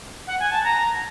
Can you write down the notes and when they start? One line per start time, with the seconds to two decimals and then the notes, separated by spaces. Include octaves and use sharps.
0.27 F#5
0.40 G#5
0.51 A5
0.64 A#5